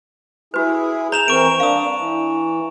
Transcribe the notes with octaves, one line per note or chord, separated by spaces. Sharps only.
E4 F#4 G#4 B4
C#5 A#5 E7 F7
E3 C4 A#4 C#6 D7
D4 F5 D#6
E3